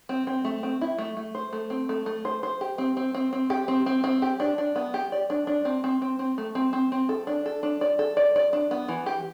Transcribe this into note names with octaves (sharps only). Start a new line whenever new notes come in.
C4
C4
A3
C4
E4
A3
A3
C5
A3
C4
A3
A3
C5
C5
G4
C4
C4
C4
C4
G4
C4
C4
C4
G4
D4
D4
B3
G4
D5
D4
D4
C4
C4
C4
C4
A3
C4
C4
C4
A4
D4
A4
D4
D5
A4
D5
D5
D4
B3
E3
G4